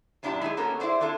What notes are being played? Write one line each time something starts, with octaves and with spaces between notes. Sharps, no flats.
F#2 A#2 D4 E4 G4 A5
G#3 E4 F#4 G#4
A#3 B3 C#4 F#4 A4
E4 G#4 C5 D5
C4 D4 E4 F4 A4